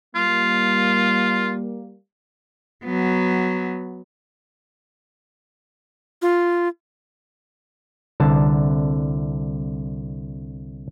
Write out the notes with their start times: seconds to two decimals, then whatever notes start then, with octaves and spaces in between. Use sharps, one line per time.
0.15 G3 A#3 F4
2.86 F#3 B3
6.22 F4
8.20 C2 D3 A5